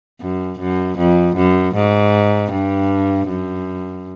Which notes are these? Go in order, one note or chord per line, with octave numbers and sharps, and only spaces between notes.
F#2
F#2
F2
F#2
G#2
G2
F#2